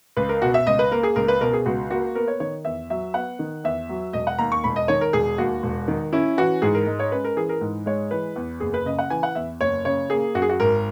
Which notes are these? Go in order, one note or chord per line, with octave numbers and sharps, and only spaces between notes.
C#2 B4
A#4
B2 F#4
E5
C#2 D#5
B4
A#3 A#4
G#4
C#2 A#4
B4
B2 A#4
G#4
C#2 F#4
A#3 F#4
B3 A#4
C#5
D#3 C#5
E2 E5
F#3 E5
B3 F#5
D#3
E2 E5
F#3
E1 D#5
F#5
D#2 A#5
C#6
E1 B5
D#5
D#3 C#5
A#4
E1 G#4
D#2 F#4
E1
D#3
C#4 E4
E3 F#4
G#2 G#4
A#4
G#3
C#5
C#4 B4
A#4
E3 G#4
A#4
G#2
G#3 C#5
E3 B4
E2
F#1 G#4
B4
C#3 D#5
F#5
E3 G#5
F#5
E2 E5
F#1 C#5
C#3 C#5
A#3 G#4
F#2 F#4
G#4
F#4
G#1 A#4